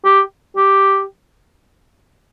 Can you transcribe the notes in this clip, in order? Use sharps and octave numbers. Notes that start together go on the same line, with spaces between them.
G4
G4